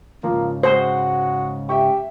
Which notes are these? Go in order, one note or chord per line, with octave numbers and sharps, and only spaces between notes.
G#2 C#3 F3 A#3
G#3 F#4 C5 F#5
G4 E5 G5 C#6